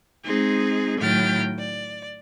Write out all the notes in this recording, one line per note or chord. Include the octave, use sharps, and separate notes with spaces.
G#3 C4 D#4 G#4
A2 D#3 F#3 G5 F6 A6
D5